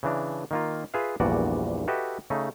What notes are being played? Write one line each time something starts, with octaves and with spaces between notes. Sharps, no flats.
C#3 E3 D4
D#3 A#3 F4
F4 G#4 B4 E5 F5
A#1 E2 G2 A#2 F#4 D5
F#4 G4 A4 B4 D#5 E5
C#3 A3 D#4